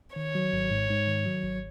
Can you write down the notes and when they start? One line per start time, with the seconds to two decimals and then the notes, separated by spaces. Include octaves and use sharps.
0.16 D#3 C#5
0.35 F#3
0.53 G#1
0.71 G#2
0.90 G#2
1.08 D#3
1.26 F#3
1.43 G#1